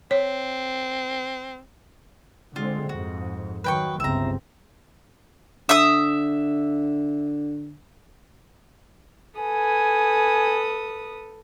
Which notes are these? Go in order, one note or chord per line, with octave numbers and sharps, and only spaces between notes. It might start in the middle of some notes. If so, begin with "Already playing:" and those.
C4 C#5
D3 G#3 C4 F4
F2 G#2 F#4
D#3 F#3 B4 G5 C#6
G1 C#2 C4 E5 A#5
D3 E5 D#6
A4 B4 G#5 D#6